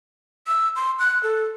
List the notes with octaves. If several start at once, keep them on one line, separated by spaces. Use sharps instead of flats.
E6
C6
F#6
A4